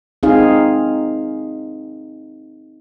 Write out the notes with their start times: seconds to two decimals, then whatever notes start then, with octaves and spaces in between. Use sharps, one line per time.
0.23 C4 D#4 G#4 F5